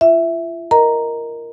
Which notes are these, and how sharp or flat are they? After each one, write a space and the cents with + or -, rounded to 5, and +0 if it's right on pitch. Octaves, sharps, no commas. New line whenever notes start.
F4 -40 E5 +0
A#4 +0 D#5 +0 A#5 +0